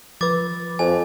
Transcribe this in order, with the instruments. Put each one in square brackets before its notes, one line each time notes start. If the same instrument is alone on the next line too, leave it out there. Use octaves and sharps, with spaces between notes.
[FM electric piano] F3 B4 [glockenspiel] D6 A6
[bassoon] F2 [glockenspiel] G#5